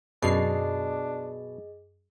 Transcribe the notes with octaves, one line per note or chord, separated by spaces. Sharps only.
F#2 B2 D4 G#4 D#5 C7